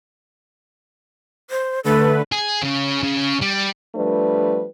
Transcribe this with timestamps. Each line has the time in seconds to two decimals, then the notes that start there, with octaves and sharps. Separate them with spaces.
1.50 C5
1.84 D3 A3 A4 B4
2.32 G#4
2.62 C#3
3.03 C#3
3.42 G3
3.95 F3 G3 A3 D4 B4